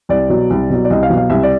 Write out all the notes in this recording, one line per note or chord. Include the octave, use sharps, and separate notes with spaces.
C2 D5
B2 F#3
C2
B2 F#3
D5
C2 D#5
F5
B2 F#3
F5
C2 E5
D5